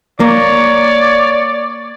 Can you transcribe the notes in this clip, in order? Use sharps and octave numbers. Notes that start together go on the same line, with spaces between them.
A#3 C#5 D5